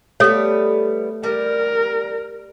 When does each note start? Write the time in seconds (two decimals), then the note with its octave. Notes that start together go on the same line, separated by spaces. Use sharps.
0.20 G3 A3 B3 A4 C#5
1.23 G3 A#4